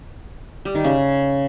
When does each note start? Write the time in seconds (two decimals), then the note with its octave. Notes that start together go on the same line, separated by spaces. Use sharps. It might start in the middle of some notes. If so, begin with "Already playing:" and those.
0.65 G3
0.75 D#3
0.84 C#3